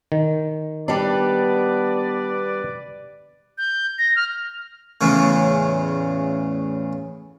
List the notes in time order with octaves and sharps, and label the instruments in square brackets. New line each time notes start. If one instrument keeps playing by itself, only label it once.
[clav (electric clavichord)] D#3
[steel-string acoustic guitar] G3 D4 [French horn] B3 [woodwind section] B4 D5
[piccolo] G6
A#6
F6
[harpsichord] E2 A2 C#3